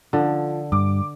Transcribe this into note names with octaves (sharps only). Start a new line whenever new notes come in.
D3 F3
G2 D6